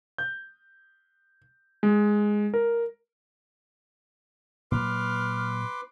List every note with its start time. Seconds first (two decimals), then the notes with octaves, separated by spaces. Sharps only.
0.18 G6
1.83 G#3
2.54 A#4
4.72 A#2 F#3 B4 C6 D6 F6